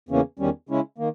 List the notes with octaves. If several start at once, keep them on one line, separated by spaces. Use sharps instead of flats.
E2 C#3 E3 A#3 C#4
E2 D#3 G3 C#4
C#3 G#3 C#4 E4
D#3 A#3